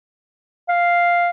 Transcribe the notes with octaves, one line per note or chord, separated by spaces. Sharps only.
F5